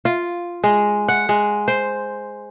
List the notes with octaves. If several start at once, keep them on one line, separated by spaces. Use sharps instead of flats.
F4
G#3
F#5
G#3
C5